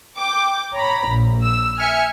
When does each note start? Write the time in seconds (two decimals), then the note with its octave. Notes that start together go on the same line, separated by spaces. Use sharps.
0.17 G5 D6
0.74 C#5 A#5 B5
1.08 A#1
1.43 E6
1.80 E5 G#5 F6 C#7